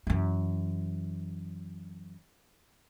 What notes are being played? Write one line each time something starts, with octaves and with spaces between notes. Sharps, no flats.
F#2 E3